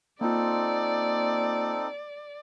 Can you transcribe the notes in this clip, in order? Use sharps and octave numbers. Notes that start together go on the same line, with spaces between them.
A#3 C4 D#4 F4 A4 D5